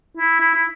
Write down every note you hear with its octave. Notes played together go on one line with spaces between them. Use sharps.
E4
E4
E4